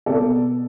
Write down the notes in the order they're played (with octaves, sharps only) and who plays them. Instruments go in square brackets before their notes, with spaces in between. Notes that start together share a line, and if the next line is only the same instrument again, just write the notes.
[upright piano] B2 B3 A4 D5